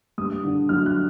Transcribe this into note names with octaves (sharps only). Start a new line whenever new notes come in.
G2 D#6
D3
F#3 F6
F#6